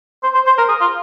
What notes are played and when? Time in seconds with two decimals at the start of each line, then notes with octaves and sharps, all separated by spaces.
0.23 C5
0.34 C5
0.46 C5
0.58 A#4
0.68 G#4
0.80 F4